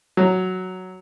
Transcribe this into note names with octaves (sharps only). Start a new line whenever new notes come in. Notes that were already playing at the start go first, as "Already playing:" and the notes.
F#3